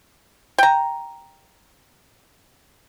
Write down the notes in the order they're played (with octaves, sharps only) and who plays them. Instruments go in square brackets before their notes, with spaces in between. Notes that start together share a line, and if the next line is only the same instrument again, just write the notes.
[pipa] G5 A#5